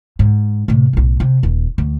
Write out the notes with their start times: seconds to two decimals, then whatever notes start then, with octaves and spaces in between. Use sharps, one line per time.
0.19 G#2
0.68 A2 C3
0.93 B1 A2
1.20 C3
1.43 D#1
1.78 D2